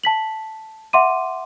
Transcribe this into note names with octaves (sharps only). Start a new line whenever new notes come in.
A5 B6 F#7
E5 F#5 C6 D6 D#7